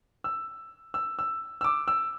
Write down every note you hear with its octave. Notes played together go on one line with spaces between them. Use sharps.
E6
E6
E6
E6
D6
E6